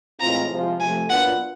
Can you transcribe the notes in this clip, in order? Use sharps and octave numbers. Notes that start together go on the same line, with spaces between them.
A2 E3 G#3 C4 F4 A#5
C3 F3 G#3 C4 F4
C3 F3 A3 G#5
A#2 F#3 B3 D4 F4 F#5